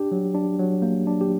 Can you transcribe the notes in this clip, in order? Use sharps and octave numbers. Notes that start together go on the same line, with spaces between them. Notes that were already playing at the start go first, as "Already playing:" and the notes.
Already playing: D4 G4
F#3
D4
F#3
A#3
D4
G4